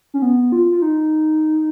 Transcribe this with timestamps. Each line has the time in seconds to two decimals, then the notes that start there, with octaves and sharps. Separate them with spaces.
0.14 C#4
0.22 B3
0.52 F4
0.71 F4
0.82 D#4